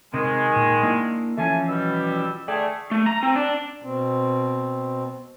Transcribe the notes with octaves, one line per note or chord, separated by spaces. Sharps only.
C3 D#3 G#3
A#2
A#3 D4 E4
E3 F3 A3 C#4 G#5 A5
B2 G3 E6
D3 A3 G#4 D5 G5
A3
A#5
C4
D4
B2 C4